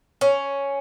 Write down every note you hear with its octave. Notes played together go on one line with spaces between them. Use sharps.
C#4